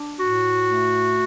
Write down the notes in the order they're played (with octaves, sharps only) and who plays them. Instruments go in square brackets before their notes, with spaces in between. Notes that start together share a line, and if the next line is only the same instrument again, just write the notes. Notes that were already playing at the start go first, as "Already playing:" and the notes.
Already playing: [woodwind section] D4
A2 F#4
A3